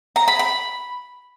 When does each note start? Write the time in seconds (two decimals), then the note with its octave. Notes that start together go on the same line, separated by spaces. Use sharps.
0.16 A#5
0.28 B5
0.39 B5